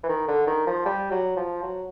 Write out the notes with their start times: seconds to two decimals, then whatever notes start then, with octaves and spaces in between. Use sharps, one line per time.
0.03 E3
0.09 D#3
0.28 D3
0.47 D#3
0.66 F3
0.86 G3
1.11 F#3
1.36 F3
1.63 F#3